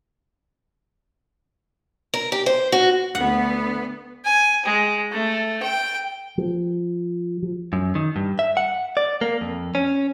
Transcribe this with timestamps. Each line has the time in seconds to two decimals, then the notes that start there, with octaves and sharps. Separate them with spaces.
2.14 A#4
2.32 G4
2.46 C5
2.72 F#4
3.15 D2 B3 F#5
4.25 G#5
4.66 G#3
5.12 A3
5.63 G5
6.38 F3
7.42 F3
7.73 F#2
7.95 D#3
8.16 G2
8.39 E5
8.57 F#5
8.97 D5
9.21 A#3
9.41 F2
9.75 C#4